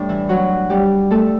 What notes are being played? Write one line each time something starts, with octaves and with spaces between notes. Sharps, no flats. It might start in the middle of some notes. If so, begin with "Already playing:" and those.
Already playing: A2 G3 D4
E3 E4
F#3 F#4
G3 G4
A3 A4